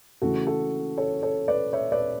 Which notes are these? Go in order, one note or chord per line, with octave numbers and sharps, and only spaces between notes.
C#3 E3 A3 F#4 A4
F#4 A4
A4 C#5
A4 C#5
B4 D5
C#5 E5
B4 D5